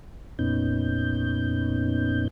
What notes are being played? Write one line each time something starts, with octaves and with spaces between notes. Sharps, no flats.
F2 A#2 B3 C#4 D#4 G6